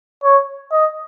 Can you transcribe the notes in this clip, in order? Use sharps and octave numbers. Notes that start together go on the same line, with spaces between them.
C#5
D#5